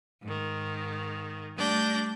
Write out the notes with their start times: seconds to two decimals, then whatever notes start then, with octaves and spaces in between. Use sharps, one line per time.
0.23 G#2 D#3
1.56 G3 A3 D4 G6 A#6